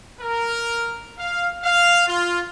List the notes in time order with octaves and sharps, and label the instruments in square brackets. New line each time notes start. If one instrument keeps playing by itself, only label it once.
[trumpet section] A#4
F5
F5
F4